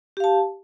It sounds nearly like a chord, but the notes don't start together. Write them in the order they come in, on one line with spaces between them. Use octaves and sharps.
G4 F5 A5